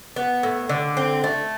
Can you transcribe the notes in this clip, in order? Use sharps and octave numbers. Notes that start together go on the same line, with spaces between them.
B3
A2
D3
C4
A3